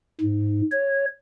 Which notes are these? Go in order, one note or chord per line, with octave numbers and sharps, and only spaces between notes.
G#2
C#5